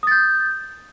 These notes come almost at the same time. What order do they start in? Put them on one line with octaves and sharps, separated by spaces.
D#6 A6 G6